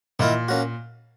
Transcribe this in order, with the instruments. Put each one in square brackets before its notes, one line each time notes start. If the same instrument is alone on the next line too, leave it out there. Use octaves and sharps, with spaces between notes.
[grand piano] A#2 [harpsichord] D#3 A#3 E4 A#4
[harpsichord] A#3 C#4 F#4